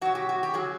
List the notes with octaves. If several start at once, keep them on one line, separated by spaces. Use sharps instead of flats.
B2 F#3 F#4
G4
F#4
G4
C#3 F#3 G#4